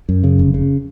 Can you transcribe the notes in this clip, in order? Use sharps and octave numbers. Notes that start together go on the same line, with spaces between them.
F#2
C#3
F1
C#3